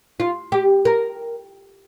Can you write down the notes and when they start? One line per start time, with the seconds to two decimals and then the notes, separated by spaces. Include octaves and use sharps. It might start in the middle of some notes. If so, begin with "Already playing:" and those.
0.20 F4
0.52 G4
0.85 A#4